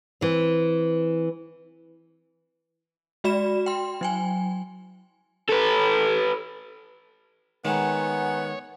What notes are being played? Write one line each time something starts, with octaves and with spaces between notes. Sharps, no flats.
E3 C4
G#3 F#4 D5 B5 E7
G5 C6
F#3 G5 G#5
A4 B4
D#3 G#3 B3 C#5 F#5 G#5 A#5